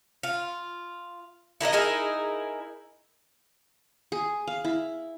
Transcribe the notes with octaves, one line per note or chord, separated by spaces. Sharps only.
F4
E4 A#4 B4 D#5
D#4 E4 G#4 A#4
G#4
F5
E4